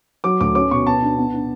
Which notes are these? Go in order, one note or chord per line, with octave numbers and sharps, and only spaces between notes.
F#3 D6
D2 D6
C#4 D6
B2 C#6
B3 A5
D4
B3
D4